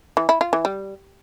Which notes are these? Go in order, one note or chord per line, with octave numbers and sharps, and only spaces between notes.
E3
E4
F4
E3
G3